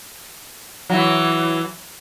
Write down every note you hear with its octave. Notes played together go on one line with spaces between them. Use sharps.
E3 F#3